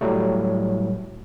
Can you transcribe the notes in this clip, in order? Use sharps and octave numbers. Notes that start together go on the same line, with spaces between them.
A2 F#3 G3 A3